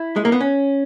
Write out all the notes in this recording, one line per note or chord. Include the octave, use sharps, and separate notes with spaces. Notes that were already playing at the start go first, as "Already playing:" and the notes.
Already playing: E4
G#3
A#3
B3
C#4